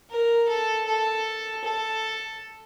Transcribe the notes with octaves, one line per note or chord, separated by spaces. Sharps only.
A#4
A4
A4
A4